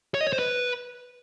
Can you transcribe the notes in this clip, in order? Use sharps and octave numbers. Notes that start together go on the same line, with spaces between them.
C#5
D#5
C#5
C5
B4